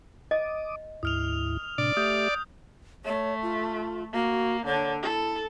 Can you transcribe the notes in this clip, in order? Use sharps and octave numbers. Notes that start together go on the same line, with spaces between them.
D#5 D6 D#6
D2 G#2 E4 D#6 F6 F7
A2 C3 D4 D5
A3 G4 E5 D#6 G6
A3 C#5
F4
A#3 F#4
D3 C#5
E4 A4